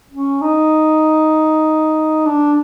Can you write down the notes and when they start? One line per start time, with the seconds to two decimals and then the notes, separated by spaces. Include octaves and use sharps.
0.11 C#4
0.41 D#4
2.26 D4